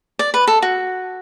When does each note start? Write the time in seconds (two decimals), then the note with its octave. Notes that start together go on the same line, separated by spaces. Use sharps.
0.19 D5
0.34 B4
0.47 A4
0.62 F#4